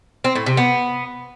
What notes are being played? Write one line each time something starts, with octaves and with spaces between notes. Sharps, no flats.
C4
A2
C3
B3